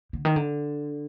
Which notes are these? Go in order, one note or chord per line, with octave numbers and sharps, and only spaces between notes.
D3
D#3
D3